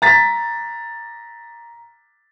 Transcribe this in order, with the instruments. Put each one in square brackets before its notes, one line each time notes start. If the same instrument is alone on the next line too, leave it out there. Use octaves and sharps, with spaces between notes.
[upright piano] A#5 A6 B6